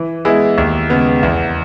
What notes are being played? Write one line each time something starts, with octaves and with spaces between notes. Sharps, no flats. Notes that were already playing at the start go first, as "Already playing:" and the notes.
Already playing: E3
G#3 B3 E4 G#4
D#2
C#3 G#3 B3
E2